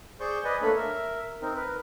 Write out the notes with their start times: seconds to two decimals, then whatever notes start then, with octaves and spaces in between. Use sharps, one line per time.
0.20 G#4 C5 D5 C6 C#6 G6
0.44 B4 D5 D#5 G#5
0.62 A3 A#3 D4 A4 C#5 B5
0.76 A#4 E5
1.42 C4 D#4 A#4
1.56 A#4 B4